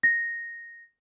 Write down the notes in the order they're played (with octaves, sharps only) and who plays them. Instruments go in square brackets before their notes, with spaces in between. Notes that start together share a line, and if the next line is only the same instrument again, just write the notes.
[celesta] A#6